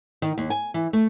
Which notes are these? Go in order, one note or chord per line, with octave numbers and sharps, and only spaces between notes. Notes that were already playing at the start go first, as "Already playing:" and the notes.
D#3
D#2
G#5
E3
A3